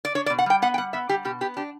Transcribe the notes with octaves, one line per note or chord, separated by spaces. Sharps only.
D5
D4 C#5
D5
B2
F#5
G3 G5
B3 F#5
G5
G3 F#5
B3 E5
G3 G4
B2 G4
B3 G4
D4 G4